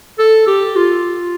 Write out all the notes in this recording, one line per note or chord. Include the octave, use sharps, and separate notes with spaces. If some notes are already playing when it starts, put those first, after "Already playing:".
A4
G4
F4